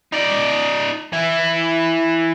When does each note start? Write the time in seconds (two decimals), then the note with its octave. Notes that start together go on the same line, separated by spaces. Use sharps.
0.13 D#4 D5
1.13 E3 E4